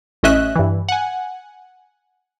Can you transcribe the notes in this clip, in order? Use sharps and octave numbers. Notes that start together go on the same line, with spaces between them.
A1 C#4 D#5 E5 F#6
G2 E3
F#5 G#5